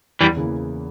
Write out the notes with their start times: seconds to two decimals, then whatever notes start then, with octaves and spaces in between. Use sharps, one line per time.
0.21 E2 E3 G3
0.37 C#3 E3 A#3